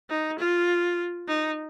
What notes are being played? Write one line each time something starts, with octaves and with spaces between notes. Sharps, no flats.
D#4
F4
D#4